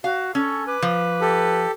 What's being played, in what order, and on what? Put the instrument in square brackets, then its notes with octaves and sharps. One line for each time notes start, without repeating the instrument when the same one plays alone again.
[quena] F#4 [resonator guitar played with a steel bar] F5
[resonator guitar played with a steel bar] C#4 [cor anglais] A4 [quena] C#6
[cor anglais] B4 [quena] D6
[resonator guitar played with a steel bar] F3
[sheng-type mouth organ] G4 A4